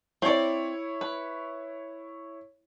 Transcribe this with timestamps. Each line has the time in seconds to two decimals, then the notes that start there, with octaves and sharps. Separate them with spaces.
0.22 C4 E4 C#5 D5
1.01 B4